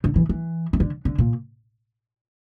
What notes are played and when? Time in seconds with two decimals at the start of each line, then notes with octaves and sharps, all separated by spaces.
0.04 D3
0.16 E3
0.29 E3
0.73 E3
0.80 D3
1.05 D3
1.18 A#2